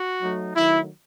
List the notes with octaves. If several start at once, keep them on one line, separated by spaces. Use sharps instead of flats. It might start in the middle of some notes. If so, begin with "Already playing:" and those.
Already playing: F#4
F#3 A3 D#4
D#3 F#3 A3 E4